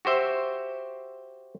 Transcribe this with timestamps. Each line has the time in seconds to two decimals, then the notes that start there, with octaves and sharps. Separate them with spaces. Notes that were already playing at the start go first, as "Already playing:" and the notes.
0.05 F#4 G4 C5 E5